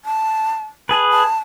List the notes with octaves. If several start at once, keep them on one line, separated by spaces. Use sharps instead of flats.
A5
G#4 B4 A5
A5